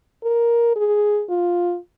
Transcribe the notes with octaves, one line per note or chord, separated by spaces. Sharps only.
A#4
G#4
F4